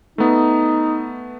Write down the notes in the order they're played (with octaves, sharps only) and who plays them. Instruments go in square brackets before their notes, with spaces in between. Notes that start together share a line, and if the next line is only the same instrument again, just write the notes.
[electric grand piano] A3 B3 [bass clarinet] D#4